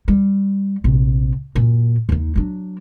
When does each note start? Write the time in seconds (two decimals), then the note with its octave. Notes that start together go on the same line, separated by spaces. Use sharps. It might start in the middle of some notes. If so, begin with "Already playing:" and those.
0.08 G3
0.84 A#1 C3
1.55 F#2 A#2
2.09 D#2 D#4
2.36 F#3 D4